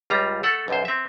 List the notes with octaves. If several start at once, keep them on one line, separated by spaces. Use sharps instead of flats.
C#2 G3 F4 A#5
A3 A4 F#5
B1 F#2 C5
C4 E5